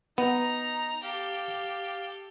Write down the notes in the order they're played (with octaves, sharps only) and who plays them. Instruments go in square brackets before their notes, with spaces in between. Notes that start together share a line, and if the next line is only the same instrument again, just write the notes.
[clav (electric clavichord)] B3 [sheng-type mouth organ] D#4 [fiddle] A#5
[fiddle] G4 A4 [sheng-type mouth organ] F5